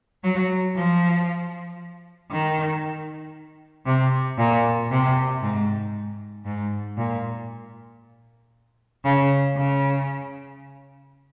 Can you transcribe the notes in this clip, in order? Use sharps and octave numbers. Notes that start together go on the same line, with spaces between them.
F#3
F3
D#3
C3
A#2
C3
G#2
G#2
A#2
C#3
C#3